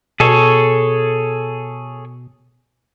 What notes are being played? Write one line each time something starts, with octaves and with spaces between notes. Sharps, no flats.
B2 G#4 A4 C#5